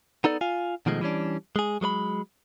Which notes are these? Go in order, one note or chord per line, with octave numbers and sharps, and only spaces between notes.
B3 D#4 A4 D5
F4 F5 G#5
B2 D#3 F3 G#3 A3
E3 G3 C#4 D4
G#3 G#4
F#3 G#3 B4 B5